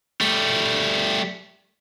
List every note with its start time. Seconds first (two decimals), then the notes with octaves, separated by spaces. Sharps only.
0.21 G3 A3